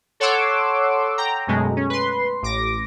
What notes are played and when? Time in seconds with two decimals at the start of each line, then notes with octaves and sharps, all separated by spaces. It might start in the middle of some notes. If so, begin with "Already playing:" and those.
0.20 A4 C#5 F#5 C6 D6 E6
1.18 G5 A#5
1.47 F#2 B2 G#3 A3
1.77 C#4
1.90 B4 C6
2.42 A1 D6 A#6